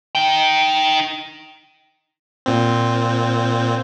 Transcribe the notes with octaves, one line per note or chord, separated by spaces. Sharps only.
D#4 G5
A#2 C4